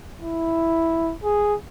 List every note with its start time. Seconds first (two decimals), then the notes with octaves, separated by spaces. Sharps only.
0.21 E4
1.24 G#4